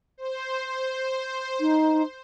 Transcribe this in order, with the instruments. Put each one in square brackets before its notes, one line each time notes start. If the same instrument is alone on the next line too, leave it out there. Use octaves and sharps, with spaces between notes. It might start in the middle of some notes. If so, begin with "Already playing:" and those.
[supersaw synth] C5
[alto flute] D#4